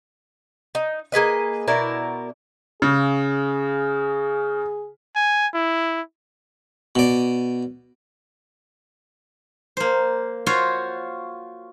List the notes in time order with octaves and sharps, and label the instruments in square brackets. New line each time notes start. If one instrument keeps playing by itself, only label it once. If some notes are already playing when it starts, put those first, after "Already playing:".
[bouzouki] D#4
A#3 G#4 B4 D#5
B2 E4 A#4 D5
[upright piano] C#3 [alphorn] G#4
[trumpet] G#5
E4
[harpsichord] B2 D5
[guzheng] A#3 C5
F4 F#4 C5 C#5